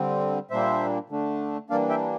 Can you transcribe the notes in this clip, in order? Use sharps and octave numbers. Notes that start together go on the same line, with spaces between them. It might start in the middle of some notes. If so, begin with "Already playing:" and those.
Already playing: D3 G3 C4
A#2 G3 A#3 D4 C5 E5
D3 A3 D4
E3 G3 A#3 D4 D5 F5
E5 G5